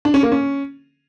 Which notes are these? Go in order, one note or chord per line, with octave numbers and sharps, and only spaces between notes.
D4
C#4
A#3
C#4